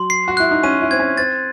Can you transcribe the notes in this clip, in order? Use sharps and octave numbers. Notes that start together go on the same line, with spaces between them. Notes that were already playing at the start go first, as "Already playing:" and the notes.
Already playing: F#3 C6
C7
F#4
E4 F#6
D#4
C#4 D#7
E4
C4 G#6
C#4
C4 A6